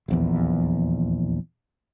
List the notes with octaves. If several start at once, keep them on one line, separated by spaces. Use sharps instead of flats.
D#1 A#1 E2